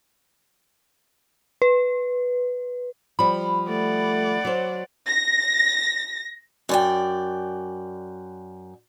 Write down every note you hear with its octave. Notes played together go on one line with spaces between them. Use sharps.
B4
F3 G3 B5
A3 D5 F#5
F#3 C5
A#6
F#2 D5 G5